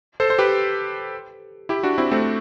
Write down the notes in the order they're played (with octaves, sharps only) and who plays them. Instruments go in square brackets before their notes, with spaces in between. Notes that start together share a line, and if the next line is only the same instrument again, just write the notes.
[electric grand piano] A4 C5
C5
G4 B4
E4 G4
D4 F#4
C4 E4
A3 C4